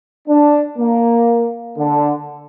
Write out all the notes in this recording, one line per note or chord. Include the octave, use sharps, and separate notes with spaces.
D4
A#3
D3